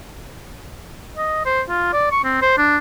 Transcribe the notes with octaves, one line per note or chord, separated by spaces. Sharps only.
D#5
C5
F4
D5
C#6
C4
C5
D4